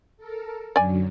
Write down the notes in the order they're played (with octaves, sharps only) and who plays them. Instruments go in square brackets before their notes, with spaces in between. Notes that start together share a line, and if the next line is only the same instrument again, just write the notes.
[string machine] A4 A#4
[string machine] F#2 D3 F#3 [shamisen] D5 G#5